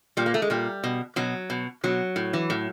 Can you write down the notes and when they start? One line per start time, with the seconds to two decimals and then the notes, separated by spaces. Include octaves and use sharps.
0.17 A#2 G3
0.26 A#3
0.34 A3
0.42 G#3
0.50 A#2 G3
0.84 B2
1.16 B2 F#3
1.50 B2
1.84 B2 F#3
2.16 A2
2.33 E3
2.50 A2